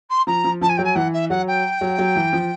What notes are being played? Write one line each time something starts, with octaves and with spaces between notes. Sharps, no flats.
C6
F3 A#5
F3
F3 A5
G#5
F#3 G5
G#5
E3 F#5
E5
F#3 F#5
G5
F#3
F#3
E3
F3